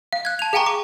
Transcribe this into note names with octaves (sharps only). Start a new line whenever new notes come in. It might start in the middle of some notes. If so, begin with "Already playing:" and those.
F5
F#6 G#6
A5 F7
G#4 F5 G5 G#5 A#5 C#6
D6